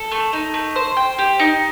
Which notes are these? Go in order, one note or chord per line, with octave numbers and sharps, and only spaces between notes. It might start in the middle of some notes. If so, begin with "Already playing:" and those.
Already playing: A4
A3
D#4
A3
C5
G5
G4
D#4